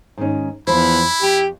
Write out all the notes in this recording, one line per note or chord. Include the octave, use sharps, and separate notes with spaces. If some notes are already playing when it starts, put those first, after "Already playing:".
G#2 D#3 C#4
E2 F3 E4 C5 B5
F2 G4